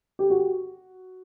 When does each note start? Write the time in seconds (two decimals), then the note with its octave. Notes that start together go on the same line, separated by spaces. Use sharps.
0.19 G4
0.30 F#4